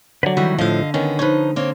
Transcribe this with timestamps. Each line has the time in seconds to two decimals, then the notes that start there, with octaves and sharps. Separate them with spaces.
0.23 D3 F#3 B4 D5
0.37 D#3 E3 G3 F#4
0.58 A2 D3 F3 D#5 F5
0.94 D#3 B3 C#4
1.19 F3 D#4 B4 C#5
1.56 A#3 C4 C#5